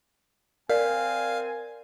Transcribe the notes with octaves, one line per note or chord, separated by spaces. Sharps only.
C4 A#4 D5 F5 G#5